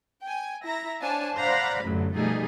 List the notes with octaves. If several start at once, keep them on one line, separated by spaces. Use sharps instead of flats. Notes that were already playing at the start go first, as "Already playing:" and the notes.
G5 G#5
E4 E5 A#5 A#6
D4 C5 C#5 F5 G#5 A5
C5 D5 F5 F#5 A#5 B5
A1 F#2 A2 D3 F#3
B2 F3 G3 A3 D#4 G#4